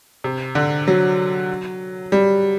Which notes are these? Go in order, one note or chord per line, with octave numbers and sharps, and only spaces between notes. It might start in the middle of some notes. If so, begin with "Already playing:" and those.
C3
D3
F#3
G3